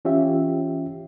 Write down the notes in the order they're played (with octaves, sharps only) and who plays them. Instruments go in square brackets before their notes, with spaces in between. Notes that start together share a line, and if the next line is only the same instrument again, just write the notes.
[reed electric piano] E3 C#4 F4 G4 E5